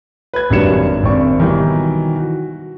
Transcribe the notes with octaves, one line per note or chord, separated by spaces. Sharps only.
B4 G#6
G#1 F#2 G3 D4 C#7 E7
G#1 C4 D5 C#6
B2 D#3 E3 F#3 G3
F#4